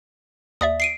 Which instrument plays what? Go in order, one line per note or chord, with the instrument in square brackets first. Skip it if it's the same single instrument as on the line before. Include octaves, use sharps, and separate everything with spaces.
[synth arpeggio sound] D#2 D5 E5 [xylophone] D#6
[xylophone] C7 D7 D#7